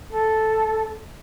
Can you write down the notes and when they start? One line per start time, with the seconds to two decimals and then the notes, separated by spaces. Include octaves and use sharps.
0.11 A4